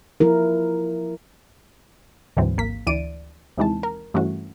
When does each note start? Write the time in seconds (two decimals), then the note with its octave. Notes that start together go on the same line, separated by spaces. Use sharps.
0.20 F3 E4 A#4
2.37 D2 G#2 D3 E3 F#3 C4
2.57 G#1 A#3 B6
2.87 D2 E3 D5 D7 D#7
3.58 D#2 C3 D#3 E3 G#3 A5
3.83 A#4
4.14 G2 E3 A3 C#4 F#4